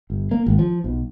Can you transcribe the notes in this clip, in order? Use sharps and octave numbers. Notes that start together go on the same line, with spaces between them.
G1
A#3
G#1
F3
B1